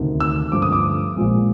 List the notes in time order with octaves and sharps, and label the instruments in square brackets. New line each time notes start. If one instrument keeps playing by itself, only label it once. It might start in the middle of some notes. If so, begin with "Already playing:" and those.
Already playing: [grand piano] D2 C3 D#3
E6
G2 D3 F3 A3 D6
D#6
D6
A#1 A#2 F3 G#3